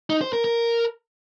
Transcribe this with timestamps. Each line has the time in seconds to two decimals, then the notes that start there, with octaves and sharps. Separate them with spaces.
0.10 D#4
0.21 C5
0.33 A#4
0.44 A#4